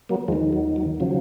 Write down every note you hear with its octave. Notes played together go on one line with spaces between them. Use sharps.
F#3 A#3
D#2 D#3 F3 G#3
F#3
F#3
C#3 F3 F#3